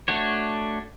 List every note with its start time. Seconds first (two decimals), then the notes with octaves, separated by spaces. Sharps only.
0.08 A3 D4 F#4 C#5